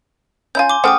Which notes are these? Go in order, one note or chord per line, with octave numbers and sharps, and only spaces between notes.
C#4 E4 F4 G#5 G6
C6 D6
C#3 A3 C5 F#5 G5 D6 D#6 F6